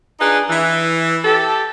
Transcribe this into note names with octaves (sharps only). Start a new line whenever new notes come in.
D4 D#4 F4 G#4 B4
E3
G4 A4